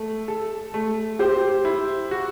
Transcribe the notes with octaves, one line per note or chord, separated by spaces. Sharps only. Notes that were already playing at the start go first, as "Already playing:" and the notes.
Already playing: A3
A4
A3
G4 C5
E4
F#4